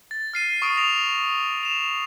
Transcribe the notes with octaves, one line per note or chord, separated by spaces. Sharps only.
A6
F6 C7 D#7
C#6 D#6 D7
A#6 F7
E7 F7